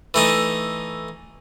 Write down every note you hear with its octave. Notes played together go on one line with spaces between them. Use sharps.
E3 A3 D#4